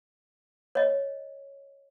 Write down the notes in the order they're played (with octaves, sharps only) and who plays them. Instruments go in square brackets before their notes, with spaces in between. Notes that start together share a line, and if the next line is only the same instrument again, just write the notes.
[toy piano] C#5 D#5